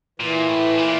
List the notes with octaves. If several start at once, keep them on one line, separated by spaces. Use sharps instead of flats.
A#2 E3
A2
A#2